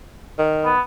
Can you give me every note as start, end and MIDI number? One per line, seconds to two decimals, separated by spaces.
0.39 0.71 51
0.65 0.80 59